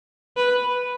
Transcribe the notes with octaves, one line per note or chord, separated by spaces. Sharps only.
B4